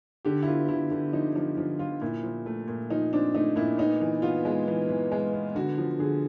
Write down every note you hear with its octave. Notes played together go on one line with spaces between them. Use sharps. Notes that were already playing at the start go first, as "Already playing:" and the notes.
D3 G4
E4
B3 F4
D3 E4
D3
F3 D#4
F3 D#4
F3
F3 F4
A#2 E4
F3
A3
A#2
F3 D#4
C4 D4
A3 D#4
A#2 E4
B3 D#4
E3
B3 F4
G#3
E3
E3
G#3
B3
D3 F#4
F3
D3 G#4